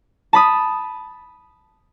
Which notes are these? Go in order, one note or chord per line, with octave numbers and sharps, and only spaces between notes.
A5 B5 D#6